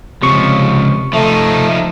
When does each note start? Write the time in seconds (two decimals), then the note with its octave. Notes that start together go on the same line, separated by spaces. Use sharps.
0.22 C#2 C3 F3 C#6
1.13 F3 A3 D#4